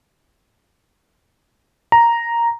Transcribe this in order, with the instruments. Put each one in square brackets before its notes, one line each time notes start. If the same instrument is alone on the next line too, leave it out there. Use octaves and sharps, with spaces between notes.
[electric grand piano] A#5